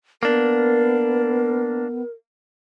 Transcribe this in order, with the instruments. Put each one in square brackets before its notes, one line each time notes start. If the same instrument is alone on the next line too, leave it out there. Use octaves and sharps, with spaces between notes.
[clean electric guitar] A#3 D4 [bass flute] B3 [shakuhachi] A#4